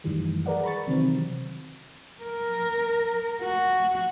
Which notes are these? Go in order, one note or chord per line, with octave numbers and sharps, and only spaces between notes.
F#2 A2 D#3 E3 G3
G#4 A#4 B4 D5 F#5
A#5 B5 C#6 A6
C3 D#3 E3 F#3 G3 C4
A#4
F#4